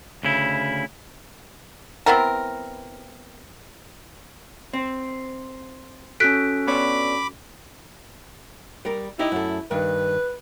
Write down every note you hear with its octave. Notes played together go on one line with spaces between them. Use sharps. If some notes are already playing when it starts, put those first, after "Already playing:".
D2 C#3 E4
B3 C4 E4 A#4
C4
C#4 F#4 A4 F#6 B6 D7
B3 D4 C#5 B5 D6
G3 A#4
D#4 E4 G4 D#5
F#2 A3
G2 D#3 B4